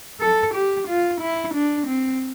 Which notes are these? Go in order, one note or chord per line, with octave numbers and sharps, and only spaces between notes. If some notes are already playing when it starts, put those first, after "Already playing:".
A4
G4
F4
E4
D4
C4